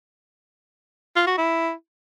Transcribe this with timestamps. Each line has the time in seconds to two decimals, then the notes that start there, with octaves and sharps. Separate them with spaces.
1.16 F4
1.27 F#4
1.38 E4